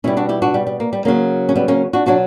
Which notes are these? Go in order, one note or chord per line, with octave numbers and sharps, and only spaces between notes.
B2 G3 C#4 E4
D4 F#4
E4 G4
D4 F#4
G3
G3
A#3
G3
C#3 F#3 A#3
C#4
G3 B3
A#3 C#4
D4 F#4
B2 F#3 D4 F#4